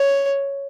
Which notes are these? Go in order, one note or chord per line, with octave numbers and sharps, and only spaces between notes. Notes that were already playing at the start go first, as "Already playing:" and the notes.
Already playing: C#5